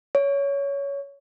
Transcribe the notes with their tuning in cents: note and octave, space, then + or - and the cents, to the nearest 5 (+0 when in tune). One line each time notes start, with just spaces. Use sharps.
C#5 +15